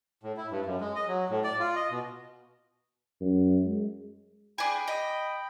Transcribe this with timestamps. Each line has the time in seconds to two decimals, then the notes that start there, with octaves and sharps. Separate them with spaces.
0.23 A2
0.37 E4
0.51 G2
0.66 F#2
0.81 G#3
0.96 D#5
1.07 F#3
1.30 A2
1.44 D5
1.60 F4
1.76 D#5
1.91 B2
3.21 F#2
3.65 G#3
4.58 D4 G#4 G5 B5
4.88 D#5